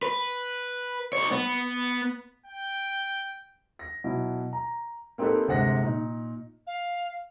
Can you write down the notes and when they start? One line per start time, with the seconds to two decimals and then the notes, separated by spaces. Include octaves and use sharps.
0.03 B4
1.13 B1 C#5
1.31 B3
2.46 G5
3.79 A#6
4.04 B2 F#3 E4
4.53 A#5
5.18 A#3 C4 D#4 G4 A4 B4
5.48 G1 C3 G#3 C5 F#5 A#6
5.83 A#2 D#4
6.67 F5